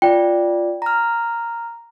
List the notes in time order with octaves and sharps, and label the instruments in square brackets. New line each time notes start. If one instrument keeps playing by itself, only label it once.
[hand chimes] F4 D5 [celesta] G5
[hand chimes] A#5 F6